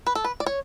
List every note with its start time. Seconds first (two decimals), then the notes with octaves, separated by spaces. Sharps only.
0.06 B4
0.15 A4
0.24 B4
0.40 D5
0.46 C#5